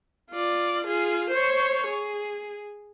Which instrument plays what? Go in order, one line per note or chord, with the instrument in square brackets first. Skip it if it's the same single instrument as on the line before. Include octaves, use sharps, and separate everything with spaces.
[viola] F4 D5
F4 G#4
C5 C#5
G#4